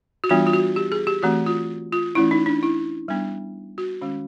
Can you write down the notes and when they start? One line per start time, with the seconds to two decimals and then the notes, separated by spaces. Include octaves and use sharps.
0.24 F#4
0.29 E3 G3 B3 D4 F4
0.47 F4
0.53 F#4
0.76 G4
0.92 G#4
1.07 G4
1.23 E3 A3 C4 F#4
1.46 F4
1.93 F4
2.15 E3 A3 C#4 E4
2.31 D#4
2.46 D4
2.63 E4
3.08 G3 B3 D4
3.78 F#4
4.01 D#3 G#3 C#4